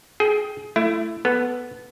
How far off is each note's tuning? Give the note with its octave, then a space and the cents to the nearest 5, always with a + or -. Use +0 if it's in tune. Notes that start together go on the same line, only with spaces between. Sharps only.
G#4 +20 G5 +0
A3 +0 E4 +25
B3 +0 A4 +0